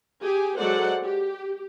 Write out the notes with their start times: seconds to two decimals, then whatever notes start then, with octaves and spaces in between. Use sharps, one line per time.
0.20 G4 G#4 G#5
0.58 F#3 G#3 A4 C5 D5 F#5
1.02 G4